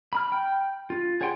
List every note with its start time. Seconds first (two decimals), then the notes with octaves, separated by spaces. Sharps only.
0.13 B5 F6
0.32 G5
0.90 F4
1.21 G#4 C#5 F#5 G5 C6